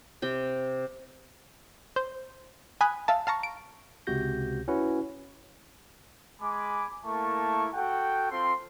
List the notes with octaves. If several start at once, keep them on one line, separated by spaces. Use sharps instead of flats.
C3 G5
C5
G#5 B5 D#6 F#6
E5 F5 A5
F5 A5 A#5 C#6
D7
C#2 C3 F#4 G4 G6 A#6
C#4 E4 F#4 B4
G#3 G#5 B5 D6
A3 A#3 E4 A#4 A5 C#6
F#4 A4 F#5 G5
C4 F4 A4 C6